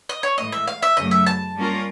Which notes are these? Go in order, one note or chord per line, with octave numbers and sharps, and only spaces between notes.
D#5
C#5
A2 E3 G#3 D#5
E5
F5
E5
F#2 C#3 F#3 A3 D#5
E5
A5
G3 A#3 C#4 F4 A#4